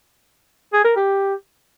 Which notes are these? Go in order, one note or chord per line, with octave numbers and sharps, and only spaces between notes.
G#4
A#4
G4